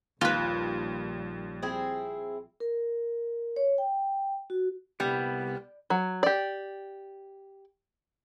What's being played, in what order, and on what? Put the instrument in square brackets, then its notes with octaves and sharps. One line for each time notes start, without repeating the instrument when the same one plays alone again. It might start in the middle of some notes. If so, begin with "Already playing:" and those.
[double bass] A#1 G3 [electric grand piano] D#2 [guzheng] F4 B4
[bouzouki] C4 E4 G#4
[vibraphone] A#4
C#5
G5
F#4
[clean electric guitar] C2 B3 [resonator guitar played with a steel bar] G3
[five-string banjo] F#3
G4 D5